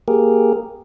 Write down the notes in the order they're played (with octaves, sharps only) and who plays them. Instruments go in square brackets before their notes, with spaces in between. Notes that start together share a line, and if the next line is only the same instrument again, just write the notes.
[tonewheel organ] A#3 G4 G#4 A#4